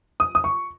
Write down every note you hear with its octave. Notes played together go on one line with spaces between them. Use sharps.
D#6
D#6
C#6